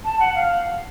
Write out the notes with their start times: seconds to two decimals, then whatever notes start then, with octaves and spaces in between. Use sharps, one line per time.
0.04 A5
0.20 F#5
0.35 F5